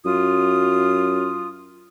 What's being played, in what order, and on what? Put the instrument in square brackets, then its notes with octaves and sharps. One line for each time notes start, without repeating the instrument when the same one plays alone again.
[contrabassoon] F#2 [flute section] F4 D#6